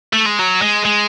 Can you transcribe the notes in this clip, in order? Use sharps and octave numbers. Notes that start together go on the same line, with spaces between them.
A3
G#3
F#3
G#3
G#3